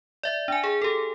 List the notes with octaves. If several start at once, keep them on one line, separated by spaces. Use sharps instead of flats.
D5 E5
D4 G#5
G#4
G4 A4